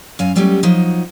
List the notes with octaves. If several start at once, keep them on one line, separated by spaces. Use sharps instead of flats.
F#2 F5 G#5
F#3 G3 A3 B3 C#4 G4
F3 F#3 D#4